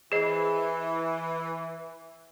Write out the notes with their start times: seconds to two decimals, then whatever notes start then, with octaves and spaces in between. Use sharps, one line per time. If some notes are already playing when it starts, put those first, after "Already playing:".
0.12 E3 G#4 C5 D#5